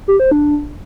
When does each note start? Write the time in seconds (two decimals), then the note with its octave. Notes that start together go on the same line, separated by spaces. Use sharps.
0.08 G4
0.20 C5
0.31 D4